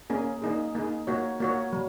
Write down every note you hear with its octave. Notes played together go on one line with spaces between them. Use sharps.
A#3 C#4 G#4
A#3 D#4 G#4
A#3 D#4 G#4
A#3 F#4 C#5
A#3 F#4 C#5
F#3